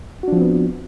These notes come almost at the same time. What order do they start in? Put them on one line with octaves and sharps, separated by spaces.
F#4 D4 F3 C4 B3